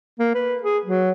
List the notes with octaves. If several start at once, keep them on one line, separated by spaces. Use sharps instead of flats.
A#3
B4
G#4
F#3